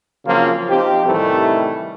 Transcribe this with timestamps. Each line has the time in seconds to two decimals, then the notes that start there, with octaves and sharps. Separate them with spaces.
0.25 C#3 F3 F#3 A#3 C4 F4
0.69 F3 C4 D#4 G4
1.05 A2 C3 D#3 E3 G3 A3